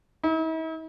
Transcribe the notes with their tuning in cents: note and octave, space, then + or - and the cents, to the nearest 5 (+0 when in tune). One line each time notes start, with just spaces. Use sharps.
E4 -45